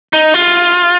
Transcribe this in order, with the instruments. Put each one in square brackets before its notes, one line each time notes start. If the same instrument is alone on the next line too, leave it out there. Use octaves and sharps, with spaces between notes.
[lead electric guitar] D#4
F4